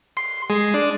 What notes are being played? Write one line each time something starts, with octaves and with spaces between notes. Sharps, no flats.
C6
G#3
D4